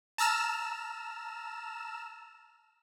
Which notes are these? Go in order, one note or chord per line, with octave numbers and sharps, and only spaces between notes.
A5 A#5 E6 F6 E7